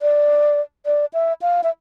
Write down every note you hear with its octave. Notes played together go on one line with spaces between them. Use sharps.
D5
D5
E5
F5
E5